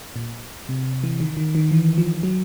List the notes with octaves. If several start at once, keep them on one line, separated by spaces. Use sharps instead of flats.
A#2
C3
E3
D#3
D#3
D#3
E3
F3
F#3